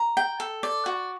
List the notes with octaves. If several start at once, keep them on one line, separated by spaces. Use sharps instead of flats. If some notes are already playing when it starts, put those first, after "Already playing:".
Already playing: A#5
G5
A4
D5
F#4